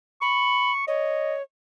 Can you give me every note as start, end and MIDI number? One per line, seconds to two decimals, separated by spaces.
0.22 0.72 83
0.22 0.83 85
0.88 1.42 73
0.88 1.35 75